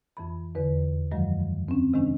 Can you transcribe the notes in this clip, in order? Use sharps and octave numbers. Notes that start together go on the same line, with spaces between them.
F2 E3 B5
E2 D3 B4
F#2 D#3 F3 F#3 G#3
C4 C#4
C3 D#3 G#3 C#4 D4